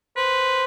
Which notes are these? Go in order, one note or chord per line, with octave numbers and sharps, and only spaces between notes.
B4 C5